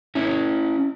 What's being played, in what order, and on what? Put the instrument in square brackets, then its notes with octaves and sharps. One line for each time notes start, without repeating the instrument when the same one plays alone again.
[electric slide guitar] C#4 E4